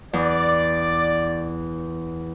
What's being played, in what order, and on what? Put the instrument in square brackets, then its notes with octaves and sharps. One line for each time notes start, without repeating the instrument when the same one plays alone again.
[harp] E2 [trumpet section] D5